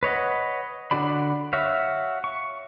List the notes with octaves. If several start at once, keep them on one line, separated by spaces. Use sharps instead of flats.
B4 C#5 D#5 F#5
D3 D4 F#4 D5 B5
F#4 C#5 E5 F5
C#6